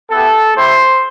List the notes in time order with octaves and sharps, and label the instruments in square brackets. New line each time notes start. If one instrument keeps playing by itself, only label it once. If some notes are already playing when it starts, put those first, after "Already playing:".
[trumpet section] B3 E4 G4 A4
A3 E4 G4 C5